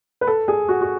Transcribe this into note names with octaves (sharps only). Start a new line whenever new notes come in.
B4
A4
G#4
F#4
F#4